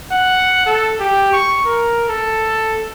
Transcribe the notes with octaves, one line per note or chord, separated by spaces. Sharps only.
F#5
A4
G4
C#6
A#4
A4